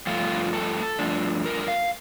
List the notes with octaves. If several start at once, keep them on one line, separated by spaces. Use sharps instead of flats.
G2 F3 A3 F4
A4
G2 F3 A3 D4
A#4
F5